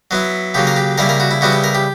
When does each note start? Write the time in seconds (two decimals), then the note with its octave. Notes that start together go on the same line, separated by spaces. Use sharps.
0.11 F#3 B3 E4
0.54 C#3 F#3 A#3 G4
0.67 A#4
0.76 G4
0.98 C#3 G3 A#3 E4 A#4
1.09 A#4
1.20 F#4
1.31 E4
1.41 C#3 G3 B3 E4 F#4
1.52 G4
1.64 A#4
1.75 G4